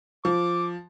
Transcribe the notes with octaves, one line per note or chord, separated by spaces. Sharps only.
F3 D6